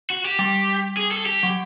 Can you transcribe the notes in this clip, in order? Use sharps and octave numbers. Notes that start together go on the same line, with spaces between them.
F#4
G4
G3
G#4
A4
G4
F#3